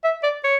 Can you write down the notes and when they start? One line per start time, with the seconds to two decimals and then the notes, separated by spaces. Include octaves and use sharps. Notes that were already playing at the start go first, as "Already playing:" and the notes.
0.04 E5
0.23 D5
0.44 C#5